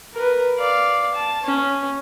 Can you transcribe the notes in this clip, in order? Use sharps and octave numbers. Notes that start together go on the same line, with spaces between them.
A#4 B4
D5 F5
A5
C#4